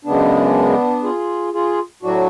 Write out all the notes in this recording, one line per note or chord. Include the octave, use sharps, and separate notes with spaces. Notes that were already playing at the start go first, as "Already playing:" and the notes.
F#2 C#3 G#3 B3 D4
F4 G#4
F4 G#4
A2 F#3 D4 F#4